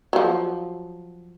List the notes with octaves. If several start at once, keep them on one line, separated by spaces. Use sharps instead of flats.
F3 F#3